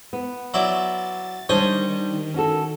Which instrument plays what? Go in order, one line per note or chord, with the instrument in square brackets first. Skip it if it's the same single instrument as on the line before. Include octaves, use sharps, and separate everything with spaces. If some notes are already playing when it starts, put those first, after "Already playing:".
[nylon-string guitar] B3
[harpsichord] F#3 E4 D5 [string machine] A6
[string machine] D#3 [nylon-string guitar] G3 D4 C5 [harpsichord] C#5 D#5 G#5
[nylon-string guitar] C#4 F#4 A4